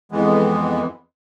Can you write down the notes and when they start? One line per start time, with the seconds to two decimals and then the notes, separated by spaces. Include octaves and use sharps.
0.11 F2 E3 G#3 B3